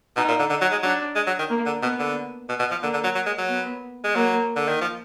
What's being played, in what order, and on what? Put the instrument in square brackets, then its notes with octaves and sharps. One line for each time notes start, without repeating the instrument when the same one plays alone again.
[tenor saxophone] B2 [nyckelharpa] D#4
[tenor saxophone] A#2
D3
[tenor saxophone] D3 [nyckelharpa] D#4
[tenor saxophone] F#3
G#3
[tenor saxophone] F#3 [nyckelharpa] D4
[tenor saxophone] G#3
F#3
D#3
[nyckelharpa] A#3
[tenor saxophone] D3
[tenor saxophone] B2 [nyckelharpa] B3
[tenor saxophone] D3
B2
B2
F3
[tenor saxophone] D3 [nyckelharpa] A#3
[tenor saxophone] D3
F#3
F#3
G#3
F#3
[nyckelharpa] B3
[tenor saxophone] G#3
[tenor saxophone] F#3 [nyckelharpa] A#3
[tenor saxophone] D3
D#3
F3